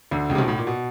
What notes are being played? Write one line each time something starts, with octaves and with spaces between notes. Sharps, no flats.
D2 D3
C#2 C#3
C3
B1 B2
A2
A#2
B2